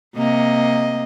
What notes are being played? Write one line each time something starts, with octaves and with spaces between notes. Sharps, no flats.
C3 A#3 D#5